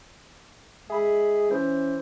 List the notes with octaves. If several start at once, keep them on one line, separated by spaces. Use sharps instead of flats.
G#3 G#4 E5 B5
E3 C#4 C5